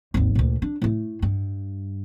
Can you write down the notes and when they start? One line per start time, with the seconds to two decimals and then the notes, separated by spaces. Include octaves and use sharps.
0.14 G#1 D#2
0.35 D2 A#2
0.62 D4
0.82 A2 A3
1.22 G2